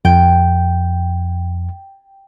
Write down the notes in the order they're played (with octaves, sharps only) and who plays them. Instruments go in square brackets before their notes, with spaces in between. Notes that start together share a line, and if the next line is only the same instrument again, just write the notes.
[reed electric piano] F2 [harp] G5